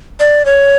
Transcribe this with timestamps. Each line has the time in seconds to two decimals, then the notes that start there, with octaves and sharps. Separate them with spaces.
0.20 D5
0.45 C#5